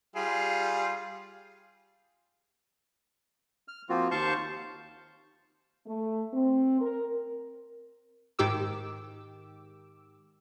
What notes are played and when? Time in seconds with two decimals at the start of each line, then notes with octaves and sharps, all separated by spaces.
0.16 G3 F4 G#4
3.68 F6
3.89 F3 A#3 C4 F4 F#4
4.11 D#2 C5 F5 A5 C#6 G6
5.86 A3
6.33 C4
6.81 A#4
8.39 G#2 D#3 G4 D6 E6